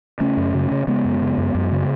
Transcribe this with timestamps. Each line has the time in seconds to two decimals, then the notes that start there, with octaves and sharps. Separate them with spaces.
0.20 C#3 A3 C#4
0.37 F#2
0.54 C#3
0.71 C#3
0.87 C#3 G#3 B3
1.05 F#2
1.22 C#3
1.38 F#2
1.55 F#2
1.72 C#3